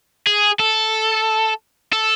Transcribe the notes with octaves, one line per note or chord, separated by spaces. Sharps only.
G#4
A4
A4